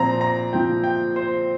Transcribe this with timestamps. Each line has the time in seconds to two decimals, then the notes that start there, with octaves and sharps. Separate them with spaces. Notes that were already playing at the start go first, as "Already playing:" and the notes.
Already playing: A#2 F3 C4 A#5
0.21 A#5
0.53 A#2 F3 C4 G5
0.84 G5
1.16 C5